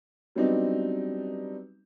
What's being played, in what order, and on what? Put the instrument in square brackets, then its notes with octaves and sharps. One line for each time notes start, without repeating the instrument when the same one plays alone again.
[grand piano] F#3 G3 B3 C4 D4 D#4